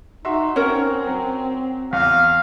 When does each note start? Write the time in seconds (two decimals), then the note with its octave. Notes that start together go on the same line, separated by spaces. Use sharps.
0.25 D#4 F#4 E5 C6
0.56 C4 C#4 A#4 C#5 F#5
1.07 F#3
1.93 E2 F5